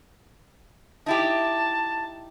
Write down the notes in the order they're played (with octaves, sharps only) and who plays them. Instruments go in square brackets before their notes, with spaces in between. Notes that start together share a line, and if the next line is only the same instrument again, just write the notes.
[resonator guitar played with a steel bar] D#4 E4 G4 [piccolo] A5